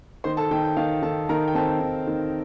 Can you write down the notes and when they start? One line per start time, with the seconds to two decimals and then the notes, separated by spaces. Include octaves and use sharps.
0.24 D#3 C5 C6
0.37 A4 A5
0.51 D#3 G5
0.64 G5
0.77 D#3 F5
1.03 D#3 A4 A5
1.29 D#3 A#4 A#5
1.48 G5
1.55 C4 A4 A5
1.81 D#3
2.07 D#3